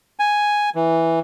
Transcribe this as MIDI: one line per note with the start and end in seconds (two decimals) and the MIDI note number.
0.19 0.70 80
0.75 1.19 52